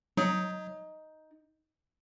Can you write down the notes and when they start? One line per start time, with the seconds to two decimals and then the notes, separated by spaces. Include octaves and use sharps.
0.17 F#3 D#4